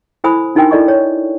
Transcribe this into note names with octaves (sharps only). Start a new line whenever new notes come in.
E4 A4 C5 G#5 B5 D#6
D4 D#4 F#4 A#4 G5 G#5
E4 A4 D5 D#5 C#6
C#5